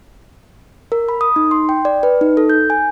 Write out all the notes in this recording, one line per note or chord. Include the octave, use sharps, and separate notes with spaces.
A#4
B5
D#6
D#4
C6
G5
D5
B4
D#4
A4
G6
G#5